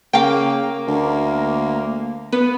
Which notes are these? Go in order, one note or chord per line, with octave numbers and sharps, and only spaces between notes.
C#3 A#3 F5 G5
D2
B3 B4